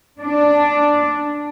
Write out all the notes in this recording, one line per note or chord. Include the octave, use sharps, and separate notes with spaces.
D4